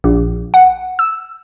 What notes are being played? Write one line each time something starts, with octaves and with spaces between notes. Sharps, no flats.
A#1
F#5
E6